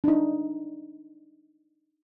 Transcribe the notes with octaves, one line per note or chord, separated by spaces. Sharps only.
D4 D#4